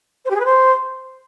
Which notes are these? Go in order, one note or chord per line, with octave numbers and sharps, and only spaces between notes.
C5
G4
G#4
B4
C5